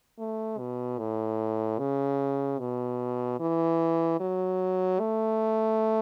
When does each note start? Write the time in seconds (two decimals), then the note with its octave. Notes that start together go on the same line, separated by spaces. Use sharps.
0.18 A3
0.58 B2
0.99 A2
1.79 C#3
2.59 B2
3.40 E3
4.20 F#3
5.00 A3